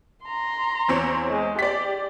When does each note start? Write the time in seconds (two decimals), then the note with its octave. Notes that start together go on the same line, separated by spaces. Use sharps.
0.25 A#5 C6
0.88 E2 C4 C#5
1.29 G#3
1.59 G4 D5 B6